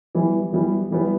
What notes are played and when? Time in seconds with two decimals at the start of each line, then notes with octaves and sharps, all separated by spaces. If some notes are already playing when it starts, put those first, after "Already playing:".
0.15 E3 G3 B3
0.53 E3 G3 B3
0.91 E3 G3 B3